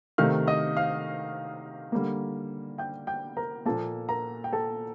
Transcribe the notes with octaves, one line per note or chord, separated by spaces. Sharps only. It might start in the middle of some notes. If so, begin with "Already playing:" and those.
C3 D#3 A3 F5 F6
D#5 D#6
F5 F6
D3 G3 A#3
G5 G6
G5 G6
A#4 A#5
A#2 F3 A#3 A4 A5
A#4 A#5
G5
A4 A5